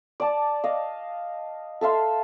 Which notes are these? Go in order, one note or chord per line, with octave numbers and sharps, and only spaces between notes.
D5 A5
D#5 F5
A4 E5 F5 C6